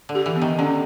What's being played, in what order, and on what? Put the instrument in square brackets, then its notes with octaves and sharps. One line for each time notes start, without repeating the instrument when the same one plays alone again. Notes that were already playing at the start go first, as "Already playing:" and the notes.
[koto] D3
[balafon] G4
[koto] E3
[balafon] B3
[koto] D#3
[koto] D3 [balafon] C#4